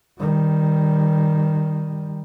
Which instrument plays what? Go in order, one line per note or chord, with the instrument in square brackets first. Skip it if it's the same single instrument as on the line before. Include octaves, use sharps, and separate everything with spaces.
[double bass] D#3 G3